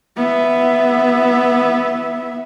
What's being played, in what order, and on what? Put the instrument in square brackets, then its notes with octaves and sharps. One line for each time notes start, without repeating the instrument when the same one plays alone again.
[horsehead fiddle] B3 E5